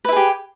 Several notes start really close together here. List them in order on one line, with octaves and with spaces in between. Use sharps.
B4 E4 G#4 G4